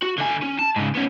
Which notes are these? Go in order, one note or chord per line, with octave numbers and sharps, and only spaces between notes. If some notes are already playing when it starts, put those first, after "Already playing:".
F#4
D3 G#5
C#4
A5
G#2 C#3
B3 C#4